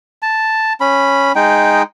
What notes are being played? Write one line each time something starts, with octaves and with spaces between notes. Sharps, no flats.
A5
C#4 B5
G#3 D#4 G5